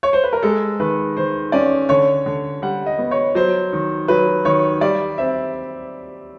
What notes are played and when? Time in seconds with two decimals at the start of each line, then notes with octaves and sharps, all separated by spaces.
0.03 C#5
0.13 C5
0.24 B4
0.33 A#4
0.43 G#3 A4
0.80 D#3 B4
1.17 D#3 C5
1.52 C#4 D5
1.89 D3 C#5
2.26 D3
2.62 G3 F#5
2.86 D#5
2.99 B3
3.11 C#5
3.35 F#3 C5
3.73 D#3
4.08 F#3 B4
4.45 D#3 C#5
4.81 G3 D5
5.18 C4 E5